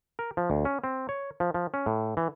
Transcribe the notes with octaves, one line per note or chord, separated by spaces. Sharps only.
A#4
F3
D2
C#4
C4
C#5
F3
F3
C#4
A2
E3